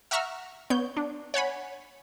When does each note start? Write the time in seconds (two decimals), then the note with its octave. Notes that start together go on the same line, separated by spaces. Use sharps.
0.11 E5 F#5 A#5 C#6 E6 F6
0.70 B3 C#5 G6
0.97 D4
1.34 C#5 F#5 G#5 B5